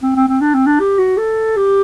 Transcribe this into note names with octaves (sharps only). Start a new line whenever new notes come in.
C4
C4
C4
D4
C4
D4
G4
F#4
A4
G4